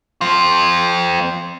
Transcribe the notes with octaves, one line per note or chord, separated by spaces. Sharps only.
C4 F4